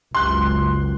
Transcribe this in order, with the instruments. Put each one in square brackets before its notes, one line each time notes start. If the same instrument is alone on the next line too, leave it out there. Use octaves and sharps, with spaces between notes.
[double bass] F#1 C#2 [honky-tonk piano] C6 F#6